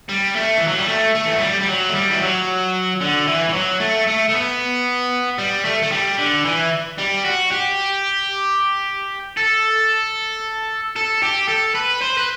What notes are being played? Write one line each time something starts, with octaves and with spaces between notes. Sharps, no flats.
G3
A3
E3
F#3
G3
A3
A3
E3
F#3
G3
G3
F#3
A3
G3
E3
F#3
D3
E3
E3
F#3
A3
A3
A3
B3
G3
A3
A3
G3
D3
E3
G3
F#4
G4
A4
A4
G4
A4
B4
C5
B4